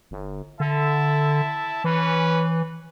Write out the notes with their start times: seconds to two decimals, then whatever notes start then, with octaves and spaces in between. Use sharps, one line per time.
0.11 G1
0.60 D3 E4 E5 A5
1.84 E3 C#4 B4